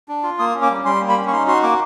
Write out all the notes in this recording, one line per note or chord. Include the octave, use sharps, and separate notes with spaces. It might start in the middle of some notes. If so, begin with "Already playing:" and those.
D4
F4
A#3 D#6
C#4
D6
G3
G3 C6
A#3
B5
C#4
C#6
D#4 C6
F#4 C6
A#3 D6